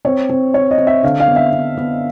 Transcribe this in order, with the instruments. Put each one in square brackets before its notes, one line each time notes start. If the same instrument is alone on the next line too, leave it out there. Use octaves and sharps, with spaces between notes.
[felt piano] C4 [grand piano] C#5
[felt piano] C4
[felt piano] C4 [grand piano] C#5
[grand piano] D#5
[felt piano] C4
[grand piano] E5
[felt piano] D3 [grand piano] F5
[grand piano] F5
[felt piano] B3
[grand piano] E5
[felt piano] B3
B3